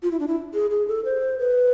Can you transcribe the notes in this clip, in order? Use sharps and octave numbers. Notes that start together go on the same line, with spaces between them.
F4
E4
D4
E4
G#4
G#4
A4
C5
B4